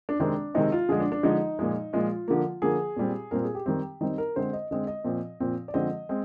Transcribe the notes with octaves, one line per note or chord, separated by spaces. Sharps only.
D4
C3 D#3 G#3 C4 D4
C3 D#3 G#3 C4 D#4
F4
D3 F3 G#3 G#4
D4
D4
D3 F3 G#3 D#4
A#2 F3 G#3
A#2 F3 G#3 F4
D3 F3 A#3
D3 F3 A#3 G#4
A#2 G3 C4
A#2 G3 C4 A#4
G#4
G4
D#3 G3 C4
D#3 G3 C4 D#4
A#4
D3 G#3 C4 C5
D#5
D3 G#3 C4 D#5
D#5
A#2 F3 C4
A#2 F3 C4
D5
D3 F3 G#3 C4 D#5
G#3 C4